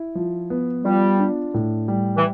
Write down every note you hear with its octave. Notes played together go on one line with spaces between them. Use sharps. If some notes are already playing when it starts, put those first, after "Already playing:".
Already playing: E4
F3
B3
G3 F4
D4
A2
G3
E3